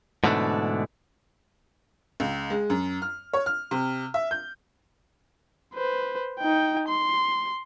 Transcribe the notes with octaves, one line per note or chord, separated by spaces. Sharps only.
G#2 B2 D3 E3 A3 D4
C#2
G#3
F#2
F6
C#5
F6
C3
E5
G6
B4 C5
D#4 G5
C6